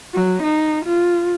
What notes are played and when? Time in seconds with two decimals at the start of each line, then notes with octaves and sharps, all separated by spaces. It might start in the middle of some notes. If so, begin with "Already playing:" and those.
0.14 F#3
0.43 D#4
0.85 F4